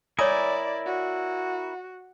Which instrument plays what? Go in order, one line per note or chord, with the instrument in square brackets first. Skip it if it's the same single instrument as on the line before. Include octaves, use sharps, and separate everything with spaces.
[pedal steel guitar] E4 A#4 G#5 [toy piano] C#5 D#6 [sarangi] D5
[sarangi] F#4